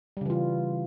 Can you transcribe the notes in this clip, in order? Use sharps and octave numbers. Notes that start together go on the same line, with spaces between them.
C#3 E3 G3 F4